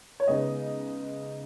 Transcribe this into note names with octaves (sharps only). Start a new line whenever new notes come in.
C#5
C#3 G#3 B3 D#4 D#5